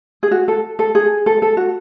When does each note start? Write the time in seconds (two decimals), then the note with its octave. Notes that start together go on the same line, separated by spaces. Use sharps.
0.23 G#4
0.31 F#4
0.48 A4
0.79 A4
0.95 G#4
1.26 A4
1.42 A4
1.57 F#4